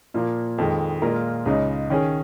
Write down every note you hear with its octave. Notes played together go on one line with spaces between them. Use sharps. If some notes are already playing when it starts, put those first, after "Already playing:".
A#2 F3 A#3
F2 D#3 G#3
A#2 G#3 F4 A#4
C#2 C#3 G#3 D#4
D#3 C#4 G#4